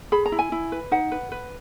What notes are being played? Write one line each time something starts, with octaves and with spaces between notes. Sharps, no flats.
G#4 B5
A#5
E4
G#5
E4
B4
D#4 F#5
B4
B4